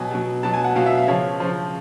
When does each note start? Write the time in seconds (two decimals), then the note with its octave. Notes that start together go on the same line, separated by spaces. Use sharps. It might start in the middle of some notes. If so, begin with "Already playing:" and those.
Already playing: B2 F#3 G#5
0.11 B2 F#3
0.43 B2 F#3 A5
0.54 G#5
0.64 F#5
0.75 B2 F#3 F5
0.86 E5
0.97 F5
1.07 C#3 F3 C#5
1.40 C#3 F3 C5